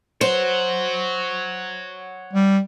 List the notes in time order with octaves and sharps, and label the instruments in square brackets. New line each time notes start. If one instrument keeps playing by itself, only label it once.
[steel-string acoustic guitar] C5 [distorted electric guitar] C#5 F#5
[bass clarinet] G3